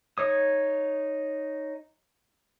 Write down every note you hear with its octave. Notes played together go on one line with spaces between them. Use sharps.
D#4 C#5 D#6